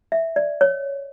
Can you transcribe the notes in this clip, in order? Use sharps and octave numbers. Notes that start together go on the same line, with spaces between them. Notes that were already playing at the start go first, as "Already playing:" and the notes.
E5
D5
C#5